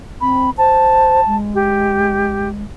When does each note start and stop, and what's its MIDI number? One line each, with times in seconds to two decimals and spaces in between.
0.21 0.50 60
0.21 0.50 83
0.58 1.21 72
0.58 1.35 81
1.27 2.64 56
1.54 2.48 67